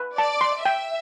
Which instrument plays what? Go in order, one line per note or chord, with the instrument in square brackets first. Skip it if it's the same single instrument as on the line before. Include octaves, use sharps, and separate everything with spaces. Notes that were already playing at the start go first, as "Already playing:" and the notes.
Already playing: [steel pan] B4
[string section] D5 [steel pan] A5
[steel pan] C6
[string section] E5 [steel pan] G5